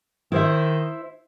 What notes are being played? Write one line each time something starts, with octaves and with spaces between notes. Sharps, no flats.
D#3 E4 C5 E5